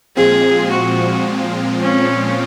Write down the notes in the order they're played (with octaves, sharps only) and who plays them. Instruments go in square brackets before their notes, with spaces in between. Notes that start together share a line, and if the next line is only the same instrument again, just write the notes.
[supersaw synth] A#2 F3 G#3 C4 F4 [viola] G#4
[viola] F#4
C#4